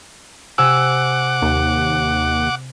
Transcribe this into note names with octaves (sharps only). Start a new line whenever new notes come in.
C3 F#5 G#5 D6 E6
D#2